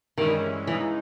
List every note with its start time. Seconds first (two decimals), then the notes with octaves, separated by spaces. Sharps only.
0.18 G2 D#3 E3 G#3 C#4 E4
0.67 C#3 E3 G#3 D#4